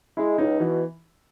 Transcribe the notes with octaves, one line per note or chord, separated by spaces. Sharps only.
G#3 E4
C#2 D#4
B2 E3